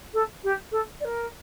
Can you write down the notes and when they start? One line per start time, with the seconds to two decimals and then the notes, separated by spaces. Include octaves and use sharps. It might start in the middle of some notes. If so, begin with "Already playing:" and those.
0.13 A4
0.43 G4
0.71 A4
1.00 D5
1.04 A#4